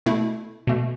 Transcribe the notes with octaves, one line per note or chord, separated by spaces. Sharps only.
B2 A3 E4
B2 A3